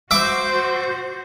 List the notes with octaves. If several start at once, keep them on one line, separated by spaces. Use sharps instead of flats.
F#4 C5 E5 D6